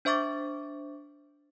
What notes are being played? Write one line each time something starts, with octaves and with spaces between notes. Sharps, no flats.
D4 C5 E5 C#6 D6 A6